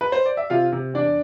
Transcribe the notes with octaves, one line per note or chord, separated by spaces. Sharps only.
B4
C5
D5
E5
C3 F4 F5
C3
E2 D4 D5